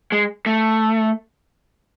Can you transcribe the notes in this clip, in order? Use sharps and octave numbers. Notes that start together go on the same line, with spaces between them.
G#3
A3